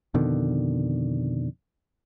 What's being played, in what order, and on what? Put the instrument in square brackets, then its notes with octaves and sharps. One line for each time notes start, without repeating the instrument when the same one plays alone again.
[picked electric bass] F2 B2 D3 D#3